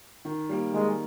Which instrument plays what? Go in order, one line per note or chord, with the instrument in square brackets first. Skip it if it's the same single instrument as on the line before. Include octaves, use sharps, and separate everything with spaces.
[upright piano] D#3
G3 A#3
[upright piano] D#3 [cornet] G#3